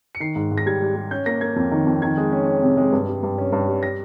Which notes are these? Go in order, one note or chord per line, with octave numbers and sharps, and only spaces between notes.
C#7
D#3 C7
G#2
G#2
A#6
G3 G#6
G3
G3
C#4 G6
A#3 A#6
A#3 G#6
F2
D#3
F2
D#3 G#6
G#3
C#4
C#4
C3
G#3
G2
G3
G2
C#4
G2
G3
A#6